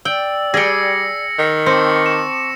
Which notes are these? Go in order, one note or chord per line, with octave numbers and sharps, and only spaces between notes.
D5 G5 E6
G3 G#4 G5 A#6 C#7
D#3
C4 A5 C#6 D6 A#6 C#7
E7